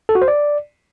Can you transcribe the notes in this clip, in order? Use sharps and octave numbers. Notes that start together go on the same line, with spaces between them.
A4
F#4
C5
D5